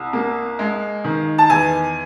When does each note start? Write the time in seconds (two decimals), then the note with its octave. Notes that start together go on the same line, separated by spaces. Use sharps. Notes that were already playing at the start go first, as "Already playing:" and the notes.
Already playing: C2
0.13 A#3
0.59 G#3
1.04 D#3
1.38 A5
1.50 E2 G#5